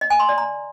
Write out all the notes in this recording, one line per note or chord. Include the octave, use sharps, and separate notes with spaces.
D#5
G#5
C6
D5
A#5